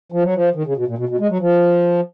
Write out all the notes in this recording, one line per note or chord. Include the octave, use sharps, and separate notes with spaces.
F3
F#3
F3
D#3
C#3
B2
A#2
B2
B2
G#3
F#3
F3